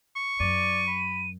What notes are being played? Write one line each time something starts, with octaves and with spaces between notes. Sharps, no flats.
C#6
F#2 D5 D#7
B5